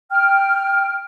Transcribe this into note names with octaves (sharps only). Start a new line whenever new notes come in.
G5 F6